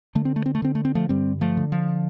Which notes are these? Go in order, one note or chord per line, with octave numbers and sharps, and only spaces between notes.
D3 A3
C4
A3
C4
A3
D3 C4
A3
C4
F3 A3
G2 G3 C4
F3 A3
D3
F3